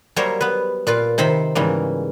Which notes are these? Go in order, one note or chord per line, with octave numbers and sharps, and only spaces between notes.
F#3 G3 A#3 A#4 C5 C#5
B3 B4
A#2 F4 B4
C3 D#3 C5 B5
G#2 C#3 E3 G3 A#3